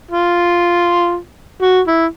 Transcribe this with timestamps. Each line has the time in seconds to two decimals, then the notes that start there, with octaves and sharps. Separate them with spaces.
0.11 F4
1.62 F#4
1.88 E4